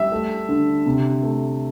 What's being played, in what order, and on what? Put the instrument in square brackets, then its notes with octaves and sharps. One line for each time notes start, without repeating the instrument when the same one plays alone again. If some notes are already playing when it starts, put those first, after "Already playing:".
Already playing: [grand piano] G3 E5
A3
D3
C3
A3